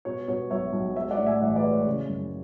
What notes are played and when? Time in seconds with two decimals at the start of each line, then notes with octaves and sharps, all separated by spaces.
0.05 B2 C#5
0.28 B2 C#5
0.50 B1 C#5 E5
0.73 B1
0.96 G#3 C#5 E5
1.11 D5 F#5
1.18 A2
1.26 E5 G#5
1.41 A1 D5 F#5
1.56 B4 D5
1.64 G#3
1.71 C#5
1.86 C#3
2.09 F#1